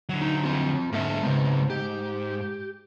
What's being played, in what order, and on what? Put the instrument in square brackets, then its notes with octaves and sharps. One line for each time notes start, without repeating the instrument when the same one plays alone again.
[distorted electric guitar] D3 F#3
[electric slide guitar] D#4
C4 F4
[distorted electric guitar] G#2 D3 [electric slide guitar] A#3 A#4 E5
[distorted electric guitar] G#2 [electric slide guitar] C#3 B3 C4
[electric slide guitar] G4